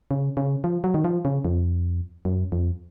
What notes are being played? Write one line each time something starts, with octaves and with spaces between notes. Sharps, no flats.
C#3
C#3
F3
F#3
D#3
F3
C#3
F2
F#2
F2